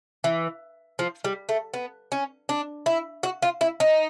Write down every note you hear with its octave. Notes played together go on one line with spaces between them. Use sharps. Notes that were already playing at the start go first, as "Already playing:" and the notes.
E3
F3
G3
A3
B3
C#4
D4
E4
F#4
F4
E4
D#4